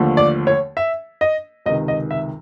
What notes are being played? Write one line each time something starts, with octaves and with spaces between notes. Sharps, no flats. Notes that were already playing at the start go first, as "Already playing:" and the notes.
Already playing: D#2 D3 F3 A3
D5
C#5
E5
D#5
C#2 C3 D#3 D#5
D#5
E5